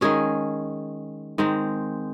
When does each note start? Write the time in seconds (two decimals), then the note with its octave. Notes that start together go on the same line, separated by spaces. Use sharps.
0.01 D#3 G#3 C#4 G#4
1.38 D#3 G#3 C4